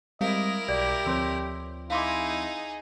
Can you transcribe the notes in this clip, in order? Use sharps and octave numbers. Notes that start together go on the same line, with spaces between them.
G3 G#3 C4 E4 A#4 D#5 F5
B1 G4 D5
D2 F3 C4 C#5 C6 E6
D#4 E4 G#4 F5 C6 D6